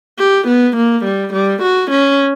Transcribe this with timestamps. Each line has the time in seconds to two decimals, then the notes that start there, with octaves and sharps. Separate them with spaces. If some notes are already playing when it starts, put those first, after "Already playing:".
0.19 G4
0.48 B3
0.76 A#3
1.04 G3
1.33 G3
1.62 F#4
1.91 C#4